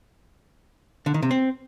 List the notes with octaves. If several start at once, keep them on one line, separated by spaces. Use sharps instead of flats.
D3
D#3
C3
C4